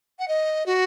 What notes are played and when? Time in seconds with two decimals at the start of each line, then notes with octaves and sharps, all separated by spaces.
0.19 F#5
0.28 D#5
0.66 F#4